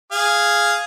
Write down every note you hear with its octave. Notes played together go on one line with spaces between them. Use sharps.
G#4 F5